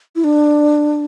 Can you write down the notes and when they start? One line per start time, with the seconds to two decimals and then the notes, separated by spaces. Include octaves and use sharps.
0.16 E4
0.24 D4